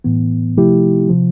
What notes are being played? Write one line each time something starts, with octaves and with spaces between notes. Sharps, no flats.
A2 E3 B3
C3 F3 A3 E4 G4
C3 F3